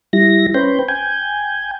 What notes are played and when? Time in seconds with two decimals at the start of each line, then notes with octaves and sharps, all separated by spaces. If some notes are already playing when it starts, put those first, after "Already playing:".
0.13 G3 E4 A#6
0.54 C#4 B4 C5 G5
0.89 G5 G#5